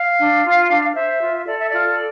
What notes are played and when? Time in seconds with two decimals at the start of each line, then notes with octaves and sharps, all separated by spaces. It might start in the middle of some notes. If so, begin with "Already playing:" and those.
Already playing: F5
0.18 D4
0.44 F4
0.70 D4
0.95 C5 E5
1.21 F4
1.46 A4 D5
1.58 E5
1.70 F4 D5